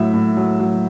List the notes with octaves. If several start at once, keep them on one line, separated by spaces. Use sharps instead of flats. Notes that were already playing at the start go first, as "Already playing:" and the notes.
Already playing: A2 F#3 E5
A2
F#3
F#3